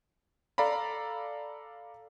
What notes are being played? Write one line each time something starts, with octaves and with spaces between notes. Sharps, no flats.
A4 D5 F5 A#5 B5